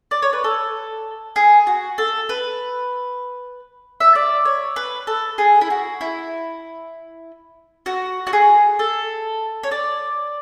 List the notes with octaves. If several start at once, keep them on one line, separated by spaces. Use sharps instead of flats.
D5
C#5
B4
A4
G#4
F#4
A4
B4
E5
D5
C#5
B4
A4
G#4
E4
F#4
E4
F#4
F#4
G#4
A4
C#5
D5